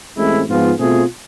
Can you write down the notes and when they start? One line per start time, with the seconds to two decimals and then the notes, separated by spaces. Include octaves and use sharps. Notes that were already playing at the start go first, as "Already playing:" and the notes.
0.17 A1 A2 G#3 C4 E4
0.48 G#2 F3 B3 F4 G#4
0.79 B2 A3 C4 F4 G#4